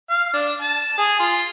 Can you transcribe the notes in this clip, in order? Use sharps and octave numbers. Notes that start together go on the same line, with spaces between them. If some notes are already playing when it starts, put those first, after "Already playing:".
F5
D4
A5
G#4
F4